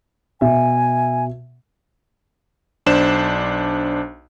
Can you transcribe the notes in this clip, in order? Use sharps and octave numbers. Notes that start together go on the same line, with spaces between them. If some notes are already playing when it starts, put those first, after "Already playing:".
B2 E5 G#5
B1 D4 C5 E7